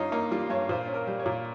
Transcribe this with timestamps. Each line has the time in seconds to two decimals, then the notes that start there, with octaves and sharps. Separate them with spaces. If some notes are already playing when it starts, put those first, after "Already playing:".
Already playing: G2 C#4 D#4 F4
0.12 A#3 D#4
0.31 G3 F4
0.50 G2 C#5
0.69 A#2 C5
0.87 C#4
0.94 A#4
1.07 G3
1.20 C#5
1.26 A#2